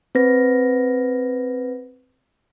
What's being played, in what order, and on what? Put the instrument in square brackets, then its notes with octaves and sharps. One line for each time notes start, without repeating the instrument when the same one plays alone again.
[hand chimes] C4 B4 A#6